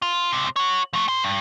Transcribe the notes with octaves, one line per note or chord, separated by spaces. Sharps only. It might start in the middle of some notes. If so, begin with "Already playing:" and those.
F4
C#2 C3
F#4 C#5
F3 A3
B4 C6
G2